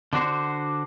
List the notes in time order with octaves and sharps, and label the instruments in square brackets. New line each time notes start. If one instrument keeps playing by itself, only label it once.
[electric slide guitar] D3 D4 F#4 C5